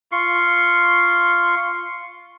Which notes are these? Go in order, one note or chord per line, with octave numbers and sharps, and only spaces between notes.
F4 C6 C#6